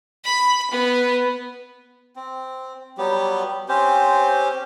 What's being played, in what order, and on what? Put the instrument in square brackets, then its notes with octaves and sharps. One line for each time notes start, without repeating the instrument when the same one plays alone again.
[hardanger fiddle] B5
B3
[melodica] C4
F#3 G3 B3 G4
C4 C#4 G4 C5